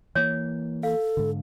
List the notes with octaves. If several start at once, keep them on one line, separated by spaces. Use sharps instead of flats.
E3 A#3 C#5
A4 F5
G#2 D3